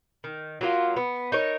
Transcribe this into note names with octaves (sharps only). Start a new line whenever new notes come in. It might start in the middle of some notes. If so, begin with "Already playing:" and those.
D#3
F#3 A#3 F4
B3
D#4 A#4 C#5